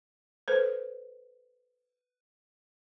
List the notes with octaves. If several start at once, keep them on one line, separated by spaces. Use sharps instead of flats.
A4 B4 C5